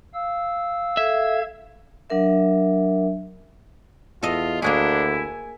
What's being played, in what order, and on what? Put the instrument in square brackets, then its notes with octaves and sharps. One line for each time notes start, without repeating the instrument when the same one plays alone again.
[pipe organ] F5 E6
[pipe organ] A4 F5 G#6 [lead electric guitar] E5
[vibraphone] F#3 D4 A#4 E5
[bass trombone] E2 [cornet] F4 [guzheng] A4 D#5
[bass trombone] D2 [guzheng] A#3 F#4 G#4 [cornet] D4 [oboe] E4
[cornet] G#5